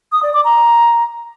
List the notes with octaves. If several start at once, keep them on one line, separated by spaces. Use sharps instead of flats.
D#6
D5
D6
A#5